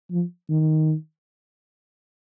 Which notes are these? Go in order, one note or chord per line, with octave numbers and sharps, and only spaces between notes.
F3
D#3